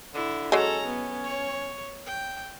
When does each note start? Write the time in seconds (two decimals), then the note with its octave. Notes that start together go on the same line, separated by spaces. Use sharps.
0.14 D3 E4
0.52 F#3 G#3 C#4 A4 A#5
0.85 B3
1.23 C#5
2.06 G5